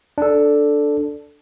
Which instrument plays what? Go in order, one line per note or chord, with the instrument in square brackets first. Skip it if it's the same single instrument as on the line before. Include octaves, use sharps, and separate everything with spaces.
[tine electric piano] D4 A4